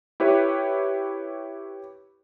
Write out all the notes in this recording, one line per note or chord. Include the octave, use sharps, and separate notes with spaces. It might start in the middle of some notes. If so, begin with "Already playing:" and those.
E4 G4 B4 C#5